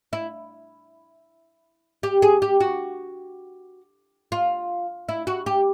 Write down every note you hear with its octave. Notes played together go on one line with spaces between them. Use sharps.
E4
G4
G#4
G4
F#4
F4
E4
F#4
G4